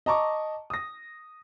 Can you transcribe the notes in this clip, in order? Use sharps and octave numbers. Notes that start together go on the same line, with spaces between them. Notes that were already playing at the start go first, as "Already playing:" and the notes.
D#5 A5 A#5 C#6 D6
D#6 A#6